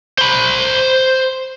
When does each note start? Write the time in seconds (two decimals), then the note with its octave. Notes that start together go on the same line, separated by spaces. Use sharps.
0.18 C5 B5